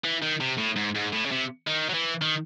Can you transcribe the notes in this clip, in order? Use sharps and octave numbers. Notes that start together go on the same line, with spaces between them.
E3
D#3
C3
A2
G#2
G#2
A2
C#3
C3
D#3
F#3
E3
D#3